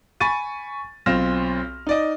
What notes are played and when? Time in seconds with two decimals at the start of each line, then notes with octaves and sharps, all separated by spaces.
0.20 G#5 B5 C#6 A6 D#7
1.06 B1 C4 F4 F6 A#6 E7
1.87 D#4 D5 D#5